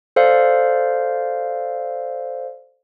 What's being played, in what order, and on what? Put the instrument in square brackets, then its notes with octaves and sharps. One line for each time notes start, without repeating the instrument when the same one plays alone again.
[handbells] A4 C5 D5 F5